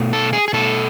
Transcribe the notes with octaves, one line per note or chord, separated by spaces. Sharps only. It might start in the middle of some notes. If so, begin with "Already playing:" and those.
Already playing: B2 A3
A4
G#4
G#4
B2 A3 A4